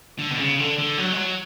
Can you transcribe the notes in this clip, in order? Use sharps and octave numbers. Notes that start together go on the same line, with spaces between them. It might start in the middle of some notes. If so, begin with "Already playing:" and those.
D3
B2
C#3
D3
D3
F#3
G#3
F#3